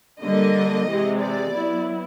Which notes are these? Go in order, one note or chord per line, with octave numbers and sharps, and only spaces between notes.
D3 G3 A#3 D#5
C3 E3 G#3
D5
F#3 B3 E4